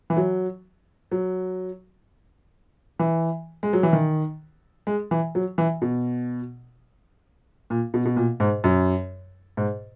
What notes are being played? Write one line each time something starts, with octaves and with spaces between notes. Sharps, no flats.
E3
F#3
F#3
E3
G#3
F#3
E3
D#3
G#3
E3
F#3
E3
B2
A#2
B2
B2
A#2
G#2
F#2
G#2